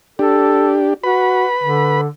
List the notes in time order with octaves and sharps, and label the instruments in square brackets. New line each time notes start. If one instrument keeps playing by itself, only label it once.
[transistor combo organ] D4 G4 [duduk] A4
[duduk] F#4 [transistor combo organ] B4 B5
[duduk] D3